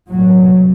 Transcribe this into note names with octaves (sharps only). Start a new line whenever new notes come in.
A1 A2 F#3
C2 C3